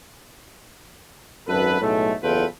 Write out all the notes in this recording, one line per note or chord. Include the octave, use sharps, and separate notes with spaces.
G#1 F#2 A4 B4
B1 A2 G#3 A3
F#1 E2 F4 A4 B4 G5